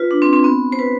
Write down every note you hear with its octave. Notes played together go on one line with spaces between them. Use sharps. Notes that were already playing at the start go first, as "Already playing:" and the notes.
Already playing: F4 B4
D4
C4
C4
B3
C5
B4